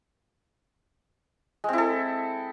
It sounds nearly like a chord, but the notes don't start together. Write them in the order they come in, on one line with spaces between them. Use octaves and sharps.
G#3 C4 E4 A4